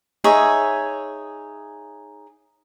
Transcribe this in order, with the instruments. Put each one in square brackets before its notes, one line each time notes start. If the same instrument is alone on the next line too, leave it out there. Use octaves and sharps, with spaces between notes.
[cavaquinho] D#4 G#4 C#5 E5